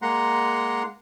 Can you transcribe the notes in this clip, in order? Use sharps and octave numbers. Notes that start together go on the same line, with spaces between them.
G#3 A#3 F#5 A#5 C6